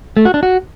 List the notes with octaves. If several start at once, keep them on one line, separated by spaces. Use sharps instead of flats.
A3
F#4
D4
F#4